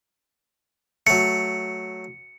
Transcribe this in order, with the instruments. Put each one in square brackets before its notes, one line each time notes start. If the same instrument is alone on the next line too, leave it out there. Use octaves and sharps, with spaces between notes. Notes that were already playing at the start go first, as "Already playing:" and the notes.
[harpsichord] F#3 A3 [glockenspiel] C#7